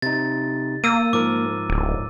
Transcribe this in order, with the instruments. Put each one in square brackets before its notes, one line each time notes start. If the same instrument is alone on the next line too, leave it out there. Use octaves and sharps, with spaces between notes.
[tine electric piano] C3 D#4 [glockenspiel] A6
[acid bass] A#3 [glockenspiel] E6 D#7
[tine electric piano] G#2 F3 A#4 [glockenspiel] D6
[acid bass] D1